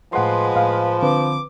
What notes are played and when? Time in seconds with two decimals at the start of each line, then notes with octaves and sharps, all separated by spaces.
0.13 A2 F3 G#3 B4 F#5 C6
0.56 A2 F5
1.03 D3 C4 B4 D6